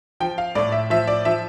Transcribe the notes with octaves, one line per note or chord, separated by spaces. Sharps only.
F3 G5
F5
A2 D5
E5
F3 E5
D5
F3 E5